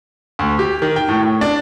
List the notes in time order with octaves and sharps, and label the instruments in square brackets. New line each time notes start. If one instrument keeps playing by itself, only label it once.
[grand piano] D2
G4
D#3
G5
A2
A2
D4